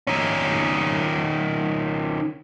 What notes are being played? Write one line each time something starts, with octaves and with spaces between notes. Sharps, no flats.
D#3 C#4